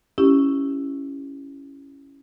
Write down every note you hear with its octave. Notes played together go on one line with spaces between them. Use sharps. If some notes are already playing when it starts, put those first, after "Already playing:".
C#4 E4 G4